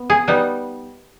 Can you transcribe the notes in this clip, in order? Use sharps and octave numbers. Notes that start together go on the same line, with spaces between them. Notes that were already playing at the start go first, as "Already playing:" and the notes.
Already playing: B3
G#4
G3 B3 D#4